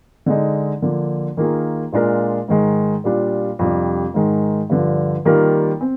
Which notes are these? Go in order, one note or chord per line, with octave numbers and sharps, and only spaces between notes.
D3 G#3 D#4
D3 F3 A#3
D#3 A#3 F4 G#4
A#2 G#3 D4 F4 A#4
G#2 D#3 G#3
A#2 G3 D4 F4
F2 C3 G3 D4
G#2 D#3 G#3
G2 D3 F3
D#3 G3 A#3 F4 A#4
C4